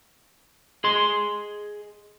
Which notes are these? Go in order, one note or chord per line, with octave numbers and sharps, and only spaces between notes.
G#4 D#5 C6